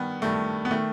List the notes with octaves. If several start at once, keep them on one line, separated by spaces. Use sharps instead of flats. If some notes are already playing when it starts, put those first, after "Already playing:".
Already playing: G2 D#3 B3
G2 D#3 A3
B3
D#3 A3